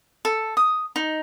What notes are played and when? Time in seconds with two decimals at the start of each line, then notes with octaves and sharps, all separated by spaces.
0.25 A4
0.57 D#6
0.96 D#4